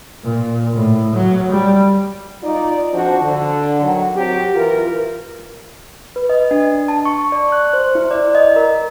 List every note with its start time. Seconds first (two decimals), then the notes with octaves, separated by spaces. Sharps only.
0.24 A#2
0.76 A2
1.15 F#3
1.52 G3
2.43 D#4 F4 D5
2.92 F2 F3 D4 F#4 C5
3.21 D3
3.81 D#3 F#3
4.16 F#3 C4 G4
4.55 E3 F4 A#4
6.16 B4
6.30 D#5
6.51 D4
6.88 A5
7.05 C#6
7.32 D5
7.52 F#6
7.73 C5
7.95 E4
8.11 D5
8.35 D#5
8.56 A#4